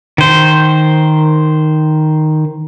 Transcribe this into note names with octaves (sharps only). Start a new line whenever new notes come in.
D#3 C5